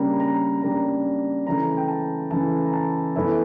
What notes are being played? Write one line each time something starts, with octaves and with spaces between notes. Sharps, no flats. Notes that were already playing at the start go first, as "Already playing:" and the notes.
Already playing: C#3 G3 A#3 D4 A#5
A#5
C#3 G3 A#3 D4 A#5
C#3 E3 A3 A#5
G5
A5
C#3 E3 A3 A5
A#5
A5
E2 E3 A3 E4